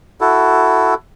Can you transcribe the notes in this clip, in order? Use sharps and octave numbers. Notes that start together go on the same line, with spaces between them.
E4 F#4 A4